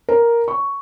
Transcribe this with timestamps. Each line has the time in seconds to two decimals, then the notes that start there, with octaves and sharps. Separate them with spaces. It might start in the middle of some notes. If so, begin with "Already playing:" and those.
0.09 A#4
0.48 C#6